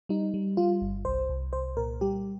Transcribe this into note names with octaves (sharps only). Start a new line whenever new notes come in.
G3 D#4
G3
G3 F4
G1
C2 C5
C2
C2 C5
A#2 A#4
G3 G4